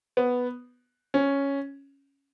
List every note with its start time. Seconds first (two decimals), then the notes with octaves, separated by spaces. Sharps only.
0.17 B3
1.14 C#4